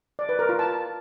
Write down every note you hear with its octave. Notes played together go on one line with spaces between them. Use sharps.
D5
B4
A#4
F4
A5